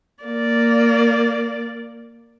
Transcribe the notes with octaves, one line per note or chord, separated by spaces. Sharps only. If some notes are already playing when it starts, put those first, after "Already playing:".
A#3 D5